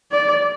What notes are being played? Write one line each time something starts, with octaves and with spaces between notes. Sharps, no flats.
D5